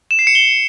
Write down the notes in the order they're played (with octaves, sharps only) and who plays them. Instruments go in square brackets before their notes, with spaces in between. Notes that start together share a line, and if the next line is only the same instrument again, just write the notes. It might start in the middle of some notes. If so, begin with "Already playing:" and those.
[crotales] E7
C7
C#7
G7